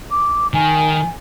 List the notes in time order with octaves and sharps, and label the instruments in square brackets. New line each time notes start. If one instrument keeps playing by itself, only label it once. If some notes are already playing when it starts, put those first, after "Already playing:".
[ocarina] D6
[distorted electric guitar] D#3 [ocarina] G#5